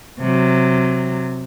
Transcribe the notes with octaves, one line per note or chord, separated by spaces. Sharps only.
C3 F#3